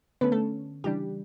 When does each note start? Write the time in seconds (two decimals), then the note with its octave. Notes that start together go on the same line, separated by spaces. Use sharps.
0.21 D3 A3 B3 C#4 B4
0.32 A3 A4
0.84 C#3 E3 G3 D4 G4